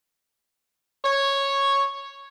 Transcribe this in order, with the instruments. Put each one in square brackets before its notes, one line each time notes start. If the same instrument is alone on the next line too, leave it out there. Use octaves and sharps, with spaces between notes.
[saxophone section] C#5